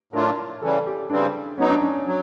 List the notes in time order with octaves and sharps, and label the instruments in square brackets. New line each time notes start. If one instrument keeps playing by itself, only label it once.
[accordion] A2 F#3 A3 D4 F4 [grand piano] A#4
[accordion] C#3 E3 G3 [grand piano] A4
[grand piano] G4
[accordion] C#3 E3 G3 C4 [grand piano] D4
[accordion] F#3 B3 D#4 [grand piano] C#4
[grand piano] D4
C#4
[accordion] F#3